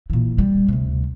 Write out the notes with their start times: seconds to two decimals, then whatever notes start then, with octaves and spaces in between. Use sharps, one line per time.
0.10 A#2 E3
0.38 G3
0.68 D2 C3